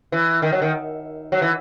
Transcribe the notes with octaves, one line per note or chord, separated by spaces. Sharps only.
E3
D#3
F#3
D#3
F#3
E3